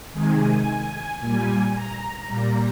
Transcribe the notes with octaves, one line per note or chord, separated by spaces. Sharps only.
C3 D#3 G#3 G#5
A#2 G3 G#5
A#5
A#2 G3